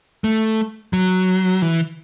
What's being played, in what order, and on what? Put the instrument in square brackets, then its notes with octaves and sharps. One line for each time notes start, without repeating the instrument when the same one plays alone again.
[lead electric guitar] A3
F#3
E3